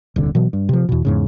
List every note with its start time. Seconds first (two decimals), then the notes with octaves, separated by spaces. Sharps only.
0.16 D#1 C2 D3
0.35 B2 E3 F#3
0.53 G2
0.69 C3 F3
0.89 E2 B2
1.05 E2 G#2 C#3